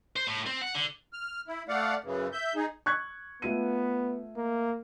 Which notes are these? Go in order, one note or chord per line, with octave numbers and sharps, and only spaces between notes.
C5
A2
C4
F#5
D3
F6
E4
A3 D5 F5 F#5
F#2 C#3 E3
E5 G6
D#4 G#4
C#6 F#6 G#6
A3 B3 F4 D#7
A#3